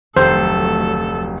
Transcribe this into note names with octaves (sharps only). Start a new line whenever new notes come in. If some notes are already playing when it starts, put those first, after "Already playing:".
F1 D2 D#3 F#3 A3 A4 C5